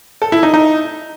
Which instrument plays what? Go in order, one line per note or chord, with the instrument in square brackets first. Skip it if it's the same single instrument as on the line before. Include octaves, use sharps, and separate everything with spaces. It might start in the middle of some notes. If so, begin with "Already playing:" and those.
[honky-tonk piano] A4
E4
D#4
D#4